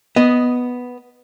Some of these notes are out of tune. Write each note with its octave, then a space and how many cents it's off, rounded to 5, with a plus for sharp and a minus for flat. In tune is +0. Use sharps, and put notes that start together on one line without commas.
B3 +0 D#5 +0